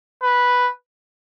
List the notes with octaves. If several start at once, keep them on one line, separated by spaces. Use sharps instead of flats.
B4